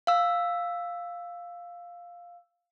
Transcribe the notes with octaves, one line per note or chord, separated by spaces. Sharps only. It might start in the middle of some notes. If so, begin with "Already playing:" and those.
F5 E6